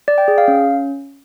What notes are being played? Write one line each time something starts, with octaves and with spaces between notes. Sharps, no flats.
D5
G5
G#4
F5
C#4